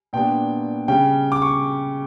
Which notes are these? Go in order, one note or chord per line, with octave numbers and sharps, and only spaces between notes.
A#2 G3 B3 D4 G5
C#3 G3 C#4 G5
D6
C#6